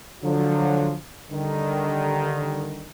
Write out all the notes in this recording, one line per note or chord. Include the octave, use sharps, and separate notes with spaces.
D3 F3 F#3
D3 D#3 G3